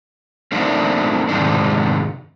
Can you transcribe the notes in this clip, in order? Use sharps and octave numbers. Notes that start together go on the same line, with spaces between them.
A3 A#3 C4 D4 D#4
F2 G#2 C3 D#3 G#3 D4